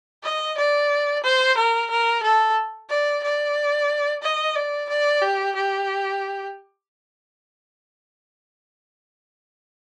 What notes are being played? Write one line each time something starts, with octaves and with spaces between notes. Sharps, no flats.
D#5
D5
C5
A#4
A#4
A4
D5
D5
D#5
D5
D5
G4
G4